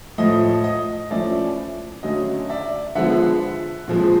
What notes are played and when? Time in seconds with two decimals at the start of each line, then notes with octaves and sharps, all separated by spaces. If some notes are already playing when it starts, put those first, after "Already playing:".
0.18 A2 F3 A3 D#5
0.64 D#5
1.10 F3 A3 C#4 E4 D5
2.03 D3 F#3 A3 C#4 D#5
2.49 D5 E5
2.95 D3 F3 G#3 B3 E5 F#5
3.88 A#2 F3 G#3 C4